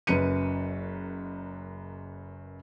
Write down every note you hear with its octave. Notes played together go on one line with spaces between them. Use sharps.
F#1 F#2 B4 C#7 D#7